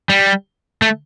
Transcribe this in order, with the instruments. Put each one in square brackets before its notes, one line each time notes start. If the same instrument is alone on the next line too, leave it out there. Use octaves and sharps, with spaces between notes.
[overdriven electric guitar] G3
A3